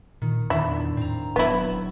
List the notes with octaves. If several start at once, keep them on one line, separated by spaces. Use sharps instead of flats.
A#2 D#3
E2 A#2 D#3 D4 E4
A2 C4 A#5
E1 F#3 B3 E4